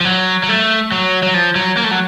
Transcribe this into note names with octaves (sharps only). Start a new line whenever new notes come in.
F3
F#3
F#3
A3
F#3
F#3
F3
F#3
A#3
A3
F#3